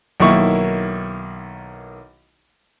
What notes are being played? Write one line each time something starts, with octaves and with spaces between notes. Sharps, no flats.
B1 D#3 A#3 E4 C#6